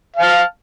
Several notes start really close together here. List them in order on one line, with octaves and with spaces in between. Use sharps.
F5 A5 F6